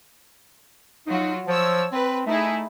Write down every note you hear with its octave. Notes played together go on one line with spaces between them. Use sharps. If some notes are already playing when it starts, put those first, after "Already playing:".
F#3 D#4 F4 F#4
F3 C#5 E6
C4 B4
A3 D#4 E4 G#4